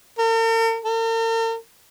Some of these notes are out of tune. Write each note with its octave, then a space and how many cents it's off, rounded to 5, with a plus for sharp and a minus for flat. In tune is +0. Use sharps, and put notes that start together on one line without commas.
A#4 -45
A#4 -45